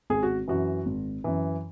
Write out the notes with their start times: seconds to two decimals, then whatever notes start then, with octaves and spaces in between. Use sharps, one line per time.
0.10 G#1 G#4
0.23 F#4
0.48 F#2 E3 F#4
0.86 G#1
1.24 F#2 E3